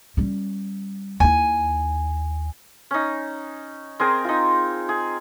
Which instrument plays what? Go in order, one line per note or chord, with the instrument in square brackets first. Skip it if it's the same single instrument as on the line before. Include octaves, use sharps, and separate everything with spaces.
[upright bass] G3 C#4
[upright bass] D#2 E4 [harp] G#5
[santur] C#4 D#4
C4 G#4 A#4
D#4 F4
G#4